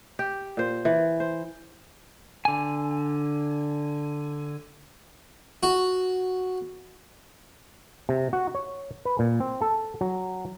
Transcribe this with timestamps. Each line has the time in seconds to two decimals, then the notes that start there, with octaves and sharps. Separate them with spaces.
0.19 G4
0.57 A#2 C5
0.85 E3
1.20 C5
2.45 D3 G#5
5.63 F#4
8.09 C3
8.33 F#4
8.55 C#5
9.05 B4
9.19 A#2
9.40 C4
9.61 A4
10.01 F#3